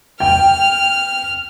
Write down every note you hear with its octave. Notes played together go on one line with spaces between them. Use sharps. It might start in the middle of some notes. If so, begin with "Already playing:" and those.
G5 F6